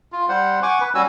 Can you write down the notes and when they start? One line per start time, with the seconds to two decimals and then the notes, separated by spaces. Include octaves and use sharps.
0.12 F4
0.29 G3 C5 F#5
0.63 F#5 G#5 C#6 D6
0.81 B4
0.95 G3 C#4 F#4 G#5 E6